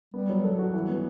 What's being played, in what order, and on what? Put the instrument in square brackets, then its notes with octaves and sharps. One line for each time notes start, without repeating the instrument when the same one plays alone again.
[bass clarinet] G3 [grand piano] B3
[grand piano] F#3
A4
F#4
E3
B3